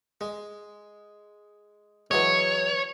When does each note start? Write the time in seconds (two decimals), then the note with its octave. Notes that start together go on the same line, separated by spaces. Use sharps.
0.21 G#3
2.11 E3 F#3 G#3 C#5